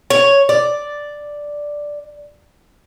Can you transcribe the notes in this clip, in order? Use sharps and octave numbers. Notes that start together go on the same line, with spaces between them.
C#5
D5